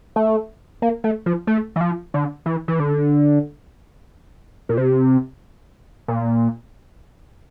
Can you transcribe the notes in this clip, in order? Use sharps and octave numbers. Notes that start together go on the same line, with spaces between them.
A3
A#3
A3
F3
A3
E3
F3
D3
E3
E3
D3
A#2
C3
A#2